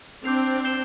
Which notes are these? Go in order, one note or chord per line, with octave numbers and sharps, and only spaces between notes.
C4 D4 D6 G6 C7 F7
G6 C7 E7 G7